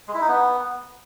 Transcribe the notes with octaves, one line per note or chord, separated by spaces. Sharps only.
G#3
E4
D#4
B3